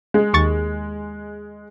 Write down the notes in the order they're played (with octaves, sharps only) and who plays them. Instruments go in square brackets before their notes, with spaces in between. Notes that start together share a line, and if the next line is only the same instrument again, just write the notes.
[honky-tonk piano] G#3
[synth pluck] D#2 C#6 A6